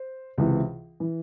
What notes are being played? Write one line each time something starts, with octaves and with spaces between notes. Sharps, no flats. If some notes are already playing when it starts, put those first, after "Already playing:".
Already playing: C5
C#2 C3 E3
E3